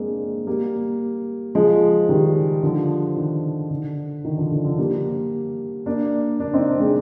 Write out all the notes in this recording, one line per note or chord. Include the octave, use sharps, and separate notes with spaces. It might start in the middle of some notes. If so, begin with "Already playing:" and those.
Already playing: G#3 A#3 C4 D4
G3 A#3
F3 G#3
D#3 G3
D3 F3
D#3
D3
D#3
D3 F3
D3
D3 F3
G3 A#3
A#3 D4
A#3 D4
C4 D#4
A#3 D4
G#3 C4